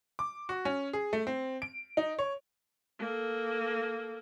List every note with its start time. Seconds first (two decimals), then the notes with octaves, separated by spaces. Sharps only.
0.19 D6
0.49 F#4
0.65 C#4
0.93 G#4
1.13 A3
1.27 C4
1.62 D7
1.97 D#4
2.19 C#5
2.99 A#3 A4